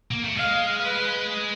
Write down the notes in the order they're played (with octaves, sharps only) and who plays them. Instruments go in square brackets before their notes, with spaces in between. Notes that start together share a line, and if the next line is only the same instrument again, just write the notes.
[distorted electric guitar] A#3
A3
[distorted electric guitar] G#3 [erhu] F5
[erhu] B4